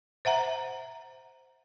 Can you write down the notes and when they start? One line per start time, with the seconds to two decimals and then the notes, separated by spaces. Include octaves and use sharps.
0.25 C5 E5 F#5 A#5